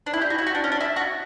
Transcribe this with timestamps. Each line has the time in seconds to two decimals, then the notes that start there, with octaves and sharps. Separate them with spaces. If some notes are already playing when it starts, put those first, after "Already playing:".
0.06 D4
0.14 E4
0.22 G4
0.30 F#4
0.38 E4
0.47 F#4
0.55 D4
0.64 C#4
0.72 D4
0.81 E4
0.96 F#4